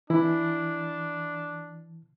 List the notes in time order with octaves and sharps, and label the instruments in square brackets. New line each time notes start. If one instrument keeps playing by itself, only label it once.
[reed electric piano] E3 [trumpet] D4 [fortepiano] E4